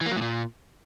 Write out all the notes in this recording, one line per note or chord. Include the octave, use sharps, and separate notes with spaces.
E3
A#3
F#3
A2
A#2